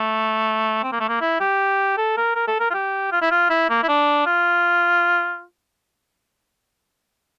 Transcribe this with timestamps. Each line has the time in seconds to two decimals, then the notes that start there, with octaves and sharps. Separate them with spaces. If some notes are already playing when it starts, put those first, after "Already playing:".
Already playing: A3
0.83 C4
0.92 A#3
1.00 A3
1.08 A#3
1.21 E4
1.40 G4
1.97 A4
2.17 A#4
2.35 A#4
2.48 A4
2.60 A#4
2.70 F4
2.74 G4
3.12 F4
3.21 E4
3.31 F4
3.50 E4
3.70 A#3
3.83 E4
3.88 D4
4.26 F4